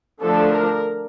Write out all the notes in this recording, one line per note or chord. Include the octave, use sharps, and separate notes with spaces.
D3 F3 A3 D4 A4
A#4